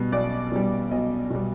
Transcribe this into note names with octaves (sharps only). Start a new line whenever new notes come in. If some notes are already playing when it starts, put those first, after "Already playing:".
Already playing: B2 G3
B1 D5
B2 G3
B1 D#5
B2 G3